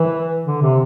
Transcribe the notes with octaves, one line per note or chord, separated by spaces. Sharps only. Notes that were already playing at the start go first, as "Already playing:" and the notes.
Already playing: E3
D3
C3